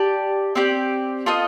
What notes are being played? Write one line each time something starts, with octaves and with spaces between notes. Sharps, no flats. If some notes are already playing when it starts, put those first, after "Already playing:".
Already playing: G4 D5 A5
C4 G4 D5
F4 A4 C5 D#5